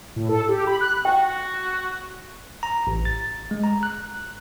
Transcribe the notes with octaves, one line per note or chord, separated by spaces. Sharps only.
A2
A4
G4
B5
F#6
F#4 G5
A#5
A1
A6
G#3
A#5
F#6